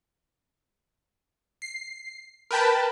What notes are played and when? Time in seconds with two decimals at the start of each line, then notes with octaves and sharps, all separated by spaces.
1.62 C7
2.51 A#4 B4 G5 A5 B5